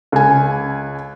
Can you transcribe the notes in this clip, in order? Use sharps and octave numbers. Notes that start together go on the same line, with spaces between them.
C#2 G#5